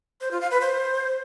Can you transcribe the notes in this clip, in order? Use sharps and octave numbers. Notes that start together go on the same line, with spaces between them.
C5
F4
F5
B4
C5